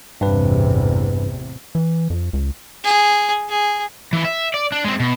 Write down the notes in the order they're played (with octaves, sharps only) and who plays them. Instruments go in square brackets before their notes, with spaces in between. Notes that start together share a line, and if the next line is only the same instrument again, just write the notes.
[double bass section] A1 E2 C3 [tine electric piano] G2 B4
[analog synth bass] E3
F2
C#2
[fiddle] G#4
G#4
[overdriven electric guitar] E3 E4
E5
D5
D4
G#3 C4
B2